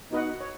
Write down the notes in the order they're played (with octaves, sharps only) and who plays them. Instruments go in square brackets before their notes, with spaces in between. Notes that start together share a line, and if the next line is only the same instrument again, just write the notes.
[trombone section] B3 D#4 [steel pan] F#4 B4 D#5 F#5
[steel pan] C#5